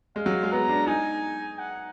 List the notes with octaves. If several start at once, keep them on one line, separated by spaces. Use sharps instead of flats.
G#3 F5
F#3
G#3
B3 A#5
D4
D#4 G#5
F#5